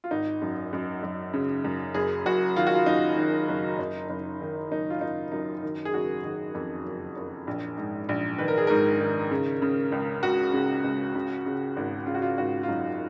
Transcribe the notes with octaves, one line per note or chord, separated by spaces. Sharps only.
F4
G#1 D#4
F#2
F#2
F#2
C#3
F#2
F#1 G#4
F#1 F#4
D#3 F4
F#4
F4
F#1 D#4
D#3
F#1
F#1
F#1
D#3
F#1 D#4
F4
F#1 D#4
F#2 D#4
D#3
G#4
F#1 F#4
D#3 G#4
F2
F#1
F#1
A#1
G#2
A#1
D#3 B4
A#4
G#4
G#2 A#4
D#3
C#3
C#3
C#2
C#2 F#4
C#3
C#2
C#3
C#3
G#1
C#3 F4
F#4
F4
G#1 F#4
F4
F#2 D#4